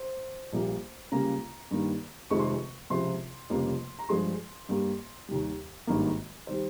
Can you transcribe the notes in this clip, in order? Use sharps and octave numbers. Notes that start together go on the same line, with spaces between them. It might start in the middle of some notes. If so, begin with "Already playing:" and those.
Already playing: C5
A#1 A#2 G3 A#3
C#2 C#3 G3 A#3 A#5
G2 D#3 G3 A#3
F1 F2 C3 D#3 G#3 C#6
C6
C#6
C#2 C3 F3 C6
F1 F2 C#3 G3 A#3
A#5
G2 F3 G#3 C6
G2 G3 A#3
D#2 D#3 G3
G#1 G2 D#3 A#3
D#3 G3 C5